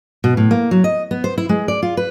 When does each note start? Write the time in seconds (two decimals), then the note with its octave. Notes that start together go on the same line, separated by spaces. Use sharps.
0.24 B2
0.37 A2
0.51 A#3
0.71 F#3
0.84 D#5
1.11 B3
1.24 C5
1.38 E4
1.49 G#3
1.68 D5
1.83 F4
1.97 B4